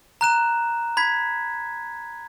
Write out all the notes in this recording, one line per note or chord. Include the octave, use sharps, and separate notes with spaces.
A#5 F#6 E7
B5 G#6 B6